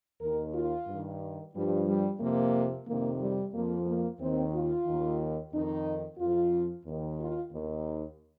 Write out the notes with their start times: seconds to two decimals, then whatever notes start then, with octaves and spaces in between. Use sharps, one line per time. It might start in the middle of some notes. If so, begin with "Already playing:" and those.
0.21 D#2 D#3 A#4
0.54 F4
0.87 G2
0.92 D#3
1.54 G2 F3 G3
1.87 G3
2.20 F2 C3 F3 A#3
2.86 F2 C3 D#3 A#3
3.21 G3
3.53 F2 F3 A#3
3.87 A#3
4.19 D#2 D#3 C4
4.53 F4
4.86 D#2 D#3
5.52 F2 D#3 D#4
6.19 F2 F3 F4
6.85 D#2 D#3
7.19 F4
7.52 D#2 D#3